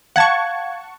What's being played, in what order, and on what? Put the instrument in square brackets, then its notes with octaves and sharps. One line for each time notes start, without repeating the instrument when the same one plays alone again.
[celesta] F5 G#6 [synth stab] F#5 A5 C#6